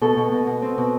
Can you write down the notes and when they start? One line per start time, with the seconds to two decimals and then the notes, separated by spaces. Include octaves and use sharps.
0.01 B2 A4
0.17 B2
0.32 B2
0.47 B2
0.62 C4
0.78 B2